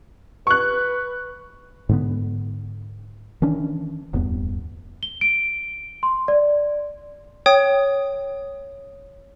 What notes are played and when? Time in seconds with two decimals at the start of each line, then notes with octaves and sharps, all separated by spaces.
0.47 B4 C#6 F#6
1.89 G#2 D3 B3
3.42 D#3 E3 C#4 D4
4.13 D1 E2 G2 B3
5.03 G7
5.21 D7
6.03 C6
6.28 D5
7.46 C#5 G5 D#6